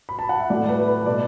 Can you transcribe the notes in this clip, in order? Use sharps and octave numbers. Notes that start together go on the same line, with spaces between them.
B5
A5
F#5
E5
A2 A3 D5
B4
B4
B2 A3 D5